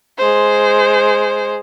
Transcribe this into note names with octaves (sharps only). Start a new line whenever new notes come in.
G#3 C5